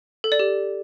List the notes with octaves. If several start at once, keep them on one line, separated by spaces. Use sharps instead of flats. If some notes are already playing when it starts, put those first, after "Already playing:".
A4
D5
G4